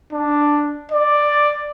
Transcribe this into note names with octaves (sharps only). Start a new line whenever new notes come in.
D4
D5